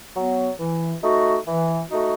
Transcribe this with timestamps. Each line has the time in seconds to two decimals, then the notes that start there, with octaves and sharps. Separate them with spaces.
0.15 F#3 B3
0.58 E3
1.02 A3 D#4 F#4
1.46 E3
1.90 A3 D#4 F#4